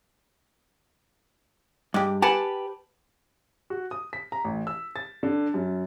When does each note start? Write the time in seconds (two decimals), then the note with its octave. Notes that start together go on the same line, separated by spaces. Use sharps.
1.94 G2 G#3 G4
2.22 G4 B4 F#5 G#5 A5
3.70 F#4
3.91 D#6
4.13 B6
4.32 A#5
4.44 A1
4.67 E6
4.96 A6
5.23 D3
5.54 F#2